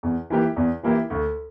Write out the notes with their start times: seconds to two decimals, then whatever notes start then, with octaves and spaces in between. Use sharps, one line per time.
0.03 E2
0.30 E3 A#3 E4 G4
0.56 E2
0.83 E3 A#3 E4 G4
1.10 D2